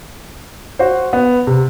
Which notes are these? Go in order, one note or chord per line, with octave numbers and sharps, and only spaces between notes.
F#4 C5
B3
C3